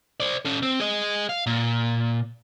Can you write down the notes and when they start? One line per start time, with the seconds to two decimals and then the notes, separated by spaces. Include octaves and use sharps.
0.20 C5 D5
0.45 C#4 A4
0.63 C4
0.80 G#4 D#5
1.29 F5
1.47 A#2